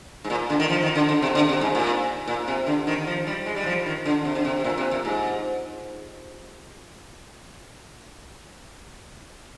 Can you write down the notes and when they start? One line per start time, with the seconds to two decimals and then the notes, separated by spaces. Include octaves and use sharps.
0.24 G#2
0.30 A#2
0.50 D3
0.60 D#3
0.70 F3
0.83 D#3
0.95 D3
1.09 D3
1.22 C3
1.35 D3
1.49 C3
1.61 G#2
1.75 A#2
2.28 A#2
2.48 C3
2.67 D3
2.87 D#3
3.07 F3
3.27 G3
3.46 G#3
3.56 G3
3.66 F3
3.86 D#3
4.06 D3
4.25 C3
4.35 D3
4.45 C3
4.60 C3
4.64 A#2
4.78 C3
4.91 A#2
5.05 G#2